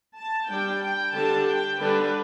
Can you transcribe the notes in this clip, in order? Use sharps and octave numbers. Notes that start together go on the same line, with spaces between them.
A5
G3 D4 G5
G5
D3 G3 D4 A5
G5
D3 G3 D4 B4